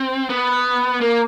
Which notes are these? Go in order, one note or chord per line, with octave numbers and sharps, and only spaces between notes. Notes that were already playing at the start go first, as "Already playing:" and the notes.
Already playing: C4
B3
A#3